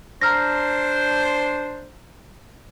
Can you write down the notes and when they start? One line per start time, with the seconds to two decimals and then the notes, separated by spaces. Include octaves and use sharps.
0.21 D4 C5 A#5 F6 A#6